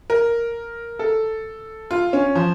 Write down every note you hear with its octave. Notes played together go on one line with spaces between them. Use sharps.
A#4
A4
F4
C#4
F3